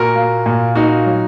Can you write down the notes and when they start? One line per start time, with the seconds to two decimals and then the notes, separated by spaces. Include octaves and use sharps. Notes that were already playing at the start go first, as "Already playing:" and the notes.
Already playing: A#2 F#4 A#4
0.16 A#3
0.46 A#2
0.75 A#3 D#4 F#4
1.06 F#3